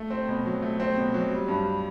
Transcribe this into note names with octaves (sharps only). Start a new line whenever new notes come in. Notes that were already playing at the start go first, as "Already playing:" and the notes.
Already playing: A3
C4
B2
F#3
A3
C4
B2
F#3
G3
G2